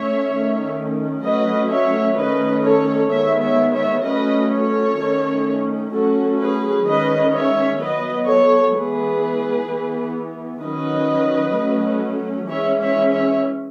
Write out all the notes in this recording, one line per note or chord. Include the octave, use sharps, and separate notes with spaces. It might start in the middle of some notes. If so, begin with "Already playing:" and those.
Already playing: A3 C#4 C#5 E5
D#3 A3 C#4
F#3 A3 C#4 B4 D#5
C#5 E5
D#3 A3 C#4 B4 D#5
A4 C#5
D#3 G#3 B3 C#5 E5
C#5 E5
C#5 E5
F#3 A3 C#4 B4 D#5
A4 C#5
D#3 A3 C#4
F#3 A3 C#4 F#4 A4
G#4 B4
D#3 G#3 C#4 B4 D#5
C#5 E5
F#3 B3 B4 D#5
A4 C#5
E3 G#3 B3 G#4 B4
E3 B3
D#3 F#3 C#4 B4 D#5
F#3 A3 C#4
E3 G#3 C#4 C#5 E5
C#5 E5
C#5 E5